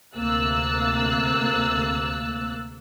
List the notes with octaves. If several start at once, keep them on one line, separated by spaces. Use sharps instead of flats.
D2 C3 A#3 E6 F#6 A6